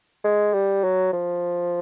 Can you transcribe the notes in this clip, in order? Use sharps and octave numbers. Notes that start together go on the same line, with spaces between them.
G#3
G3
F#3
F3